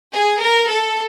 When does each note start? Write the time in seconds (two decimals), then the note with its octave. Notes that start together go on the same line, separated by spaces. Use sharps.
0.12 G#4
0.41 A#4
0.69 A4